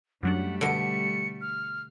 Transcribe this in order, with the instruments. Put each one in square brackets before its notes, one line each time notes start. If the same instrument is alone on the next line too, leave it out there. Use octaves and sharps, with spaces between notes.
[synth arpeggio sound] F#2 F#3 D4 [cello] G3 A3 [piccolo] F#5
[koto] B2 D3 [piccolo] C#7 [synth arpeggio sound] D7
[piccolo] F6